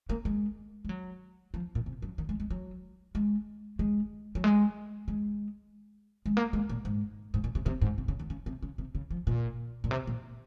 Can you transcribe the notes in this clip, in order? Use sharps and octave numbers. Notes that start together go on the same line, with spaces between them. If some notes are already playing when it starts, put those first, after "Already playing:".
A#3
G#3
G#3
F#3
F3
A#2
C3
F#2
D#3
G#3
G#3
F#3
G#3
G#3
F#3
G#3
G#3
G#3
A#3
G#3
A#2
G#2
G#2
A#2
C3
C3
G#2
C3
C#3
D#3
C#3
C3
C#3
C3
C#3
F3
A#2
A#2
C3
A#2